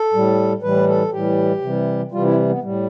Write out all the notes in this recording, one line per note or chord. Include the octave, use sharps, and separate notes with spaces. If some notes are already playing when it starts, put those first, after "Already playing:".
Already playing: A4
A2 G3
A2 E3 G3 B4
A4
A2 E3 G3 G4
C3 E3 G3
C3 E3 G3 F4
E4
B3
A2 G3